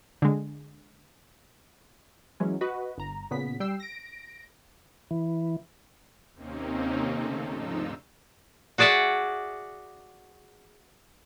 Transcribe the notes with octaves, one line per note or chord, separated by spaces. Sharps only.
D3 G#3
E3 F#3 G#3 C#4
F#4 B4 D#5
G1 A#5
A#2 C#3 B3 B6
G3 G5 E6 C7
A#6 D7
E3
D#2 C3 A#3 C4 C#4 D#4
C#3 A3 A4
G#2 F3 D4 D#4 F4 E6
F#4 G#4 D5 E5 F#5